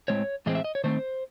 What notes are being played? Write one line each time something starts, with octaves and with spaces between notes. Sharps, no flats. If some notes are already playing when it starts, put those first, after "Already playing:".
A2 G#3 C4 C#5
A2 E3 G#3 C4 D#5
E5
D#5
C#5
D#3 A3 C4 C5